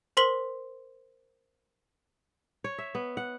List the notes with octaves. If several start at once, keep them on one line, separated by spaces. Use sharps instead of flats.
A#4 C5 C6 B6 F#7 G7
C#5
E5
B3
F#5